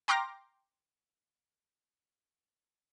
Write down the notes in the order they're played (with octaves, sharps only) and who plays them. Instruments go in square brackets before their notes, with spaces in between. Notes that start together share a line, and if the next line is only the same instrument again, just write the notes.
[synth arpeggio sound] G5 A#5 C6 D6 F6 A#6